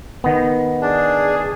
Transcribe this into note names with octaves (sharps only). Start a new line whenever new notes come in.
D#3 B3
D4 G#4